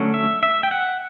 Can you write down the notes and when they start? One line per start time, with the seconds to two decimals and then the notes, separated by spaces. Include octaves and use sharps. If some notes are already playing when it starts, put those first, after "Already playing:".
Already playing: D3 F#3 A3 C#4
0.14 E5
0.43 E5
0.63 G5
0.71 F#5